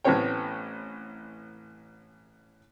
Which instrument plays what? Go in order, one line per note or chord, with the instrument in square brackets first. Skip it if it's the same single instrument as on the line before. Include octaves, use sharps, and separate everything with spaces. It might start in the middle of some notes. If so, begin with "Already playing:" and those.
[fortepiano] A1 A2 B3 C4 C#5 G5